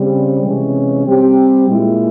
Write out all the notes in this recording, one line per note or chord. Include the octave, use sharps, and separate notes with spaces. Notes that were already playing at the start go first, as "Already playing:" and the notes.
Already playing: C#3 G3 C4
C3 E3 G#3 C#4
G3 C4 G4
A#2 G#3 E4